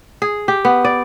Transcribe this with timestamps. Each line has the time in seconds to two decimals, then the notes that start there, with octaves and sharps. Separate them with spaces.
0.22 G#4
0.48 G4
0.65 B3
0.85 D5